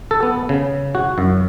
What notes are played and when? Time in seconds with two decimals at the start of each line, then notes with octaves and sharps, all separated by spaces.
0.11 A4
0.23 B3
0.49 C#3
0.95 F#4
1.18 F#2